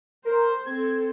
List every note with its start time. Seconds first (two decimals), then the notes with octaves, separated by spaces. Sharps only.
0.25 A#4 C5
0.66 C4 A4 G#6